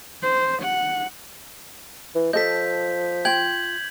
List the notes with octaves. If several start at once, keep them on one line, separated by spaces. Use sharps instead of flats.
C5
F#5
E3
F3 A4 D#5 G6 B6
F4 G5 G6 G#6 F#7